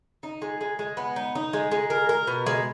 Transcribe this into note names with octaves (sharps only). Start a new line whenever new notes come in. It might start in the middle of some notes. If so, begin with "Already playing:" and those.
D#4
G#3
G#3
G#3
B3
D#4
D#4
G#3
G#3
A#4
A#4
B2
G#3